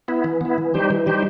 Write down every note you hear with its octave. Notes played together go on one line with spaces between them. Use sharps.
B3 E4
E3
B3 E4
E3
G3 D#4 G4 C5
E3
G3 D#4 G4 C5